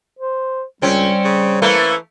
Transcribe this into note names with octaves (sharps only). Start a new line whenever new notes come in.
C5
C#2 G3 C4 C#4
C#3
E3 A3 A#3